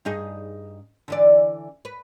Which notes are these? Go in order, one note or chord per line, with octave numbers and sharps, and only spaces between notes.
G2 D#4 G#4
D3 E3 D5
B4